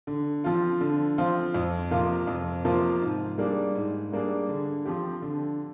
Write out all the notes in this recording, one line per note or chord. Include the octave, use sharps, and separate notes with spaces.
D3
F3 C4 F4
D3
F3 C4 F4
F2
C3 F3 A#3 F4
F2
C3 F3 A#3 F4
G#2
G3 A#3 D4 G#4
G#2
G3 A#3 D4 G#4
D3
F3 C4 G4
D3